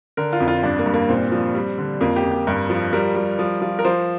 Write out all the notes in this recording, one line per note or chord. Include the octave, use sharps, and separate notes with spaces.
D3 A#4
F4
F2
F4
G2 D4
A#3
G2
A#3
A#2 C4
F3
G3
D3
F2 A#3
G4
F2
G4
G2 A#4
F3
G3 A#4
G3
F3
F3
A#4
F3 C5